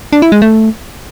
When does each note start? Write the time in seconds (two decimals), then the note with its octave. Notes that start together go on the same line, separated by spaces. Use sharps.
0.13 D4
0.22 E4
0.32 G#3
0.42 A3